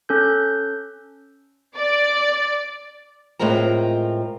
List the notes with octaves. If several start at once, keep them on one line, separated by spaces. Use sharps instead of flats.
C#4 A4 G6
D5
A2 G#3 C4 F4 A#4 A#5